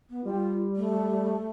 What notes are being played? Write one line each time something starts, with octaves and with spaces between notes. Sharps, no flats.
B3
G3 F4
A3